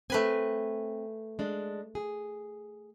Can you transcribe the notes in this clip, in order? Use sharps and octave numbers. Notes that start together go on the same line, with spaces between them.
A3 C4 B4 G#5
G#3 D4
G#4